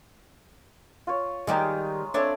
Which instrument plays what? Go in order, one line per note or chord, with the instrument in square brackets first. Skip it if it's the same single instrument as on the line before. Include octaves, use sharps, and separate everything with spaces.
[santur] F4 C#5
[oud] D#3 G3 G4 [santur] G#3 A#5
[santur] A3 C4 [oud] D4 C#5